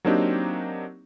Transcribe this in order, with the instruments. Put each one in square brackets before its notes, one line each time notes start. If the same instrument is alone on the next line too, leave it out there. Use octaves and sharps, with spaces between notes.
[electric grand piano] F#3 A#3 C4 D4 D#4 G4